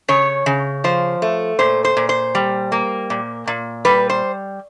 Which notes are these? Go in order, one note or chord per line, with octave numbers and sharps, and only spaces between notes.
C#3 C#5
C#3
F3 C5
A3
A#2 C5
C5
A#2
C5
G3
A#3
A#2
A#2
G3 B4
C5